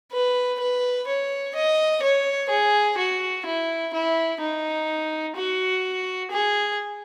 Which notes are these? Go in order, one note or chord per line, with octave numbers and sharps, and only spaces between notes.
B4
B4
C#5
D#5
C#5
G#4
F#4
E4
E4
D#4
F#4
G#4